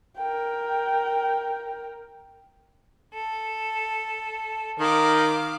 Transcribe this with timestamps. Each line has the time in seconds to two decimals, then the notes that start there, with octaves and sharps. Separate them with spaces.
0.18 A#4 G5
3.13 A4
4.80 D#3 F5 D6